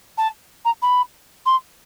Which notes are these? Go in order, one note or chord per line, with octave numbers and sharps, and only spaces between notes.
A5
A#5
B5
C6